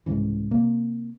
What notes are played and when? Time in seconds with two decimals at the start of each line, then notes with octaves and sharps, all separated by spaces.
0.06 C2 G#2 C#3 E3
0.51 C3 A#3